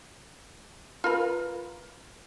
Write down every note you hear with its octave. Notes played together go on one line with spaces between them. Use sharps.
F4 A#4 B4